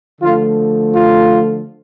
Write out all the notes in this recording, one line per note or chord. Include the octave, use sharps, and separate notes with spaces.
D3 F3 A3 F4
F4